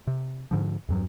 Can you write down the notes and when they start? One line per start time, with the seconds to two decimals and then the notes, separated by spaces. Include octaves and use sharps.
0.07 C3
0.51 G#2 D3 F3
0.89 E2 G2 F#3